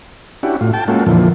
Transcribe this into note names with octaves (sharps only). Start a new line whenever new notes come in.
C#4 D4 E4 F#4 G4
A2 F4
G5 A5
G#3 A#3 C#4 F4 F#4 A4
F2 A#2 D3 E3 F3